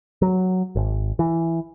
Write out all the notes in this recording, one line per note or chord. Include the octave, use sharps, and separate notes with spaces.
F#3
G#1
E3